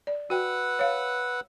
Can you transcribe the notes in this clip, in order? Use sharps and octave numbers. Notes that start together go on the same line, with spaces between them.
D5
F#4 B4 F#5 G5 E6
C#5 F5